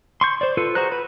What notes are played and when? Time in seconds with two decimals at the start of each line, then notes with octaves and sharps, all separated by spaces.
0.21 C6 C#6 G6
0.41 C5 D5
0.57 F4 A4 B4
0.75 F#4 G#4 C5 A#5 F#6
0.92 B4 B5